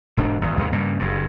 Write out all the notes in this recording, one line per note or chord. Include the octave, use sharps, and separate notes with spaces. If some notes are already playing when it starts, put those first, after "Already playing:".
E1 G#2 D4
G#1 E2
D#2 G#2 C3 D#3
G2 C#3 A#3
F#1 G2